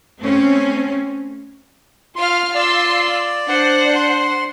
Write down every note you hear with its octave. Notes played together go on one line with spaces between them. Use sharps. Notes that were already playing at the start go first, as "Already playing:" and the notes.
A3 C4 C#4
F4 F5 C6 F6
F4 D5 C6 E6
D4 C5 F#5
C6